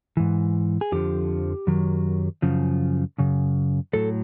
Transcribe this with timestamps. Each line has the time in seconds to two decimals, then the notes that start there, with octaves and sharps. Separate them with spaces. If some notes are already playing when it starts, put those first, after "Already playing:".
0.17 G#2 E3
0.81 G#4
0.92 F2 D3 F3 G4
1.67 F#2 D#3 F#3
2.42 F#2 C#3 F3
3.18 F#2 C#3
3.93 A2 F#3 A4